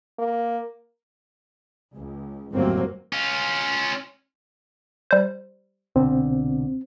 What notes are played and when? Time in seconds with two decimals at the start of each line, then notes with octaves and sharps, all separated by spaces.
0.19 A#3
1.96 C#2
2.54 G1 F2 A2 F#3 A#3 C4
3.13 C#4 F4
5.11 G3 C5
5.96 C2 B2 D3 C4